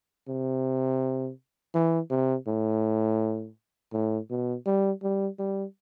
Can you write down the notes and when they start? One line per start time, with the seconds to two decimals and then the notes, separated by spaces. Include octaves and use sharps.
0.28 C3
1.74 E3
2.10 C3
2.47 A2
3.93 A2
4.30 B2
4.66 G3
5.03 G3
5.39 G3